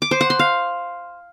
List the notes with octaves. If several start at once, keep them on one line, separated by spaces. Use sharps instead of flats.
D6
C5
F#5
C6
F5